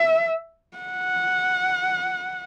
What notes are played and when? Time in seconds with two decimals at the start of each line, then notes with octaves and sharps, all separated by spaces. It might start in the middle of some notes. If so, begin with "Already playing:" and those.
Already playing: E5
0.78 F#5